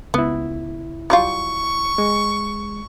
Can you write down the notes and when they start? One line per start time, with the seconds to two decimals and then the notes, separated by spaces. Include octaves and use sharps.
0.14 C#2 B3 E4
1.10 F#3 G3 F4 C#6
1.98 G#3